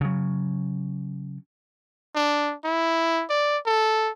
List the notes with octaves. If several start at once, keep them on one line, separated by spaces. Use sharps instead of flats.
C#3 F#3
D4
E4
D5
A4